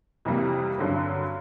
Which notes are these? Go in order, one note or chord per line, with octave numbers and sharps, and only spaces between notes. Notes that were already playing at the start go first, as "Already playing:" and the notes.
F2 C3 E3 G3 A#3
G2 D3 F#3